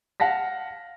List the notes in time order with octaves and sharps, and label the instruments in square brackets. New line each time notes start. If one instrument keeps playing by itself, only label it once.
[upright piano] F5 F#5 A5 A#6 B6